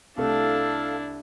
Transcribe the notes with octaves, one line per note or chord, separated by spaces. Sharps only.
C2 A3 D4 E4 A4 F5 A5